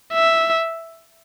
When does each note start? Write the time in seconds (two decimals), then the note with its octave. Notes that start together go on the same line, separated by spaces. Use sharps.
0.13 E5